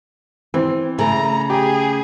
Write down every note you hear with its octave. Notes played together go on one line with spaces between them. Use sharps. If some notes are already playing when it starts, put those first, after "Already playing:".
E3 C4
C#3 A3 A#5
G4 G#4